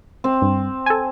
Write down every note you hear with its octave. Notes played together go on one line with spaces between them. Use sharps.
C4
G2
A4 G#5